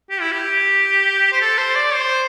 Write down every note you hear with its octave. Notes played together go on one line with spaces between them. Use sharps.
G4
E4
G4
C5
A4
C5
D5
C5